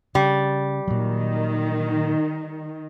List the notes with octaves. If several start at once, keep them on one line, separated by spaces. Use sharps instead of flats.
C#3 G3
A#2 D#3 F#3